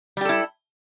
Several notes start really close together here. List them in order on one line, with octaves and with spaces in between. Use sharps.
G3 G4 A4 E4